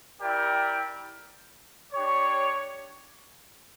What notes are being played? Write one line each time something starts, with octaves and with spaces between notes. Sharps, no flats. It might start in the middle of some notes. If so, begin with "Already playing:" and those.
E4 G4 A#4 D5 G5
D4 G4 C#5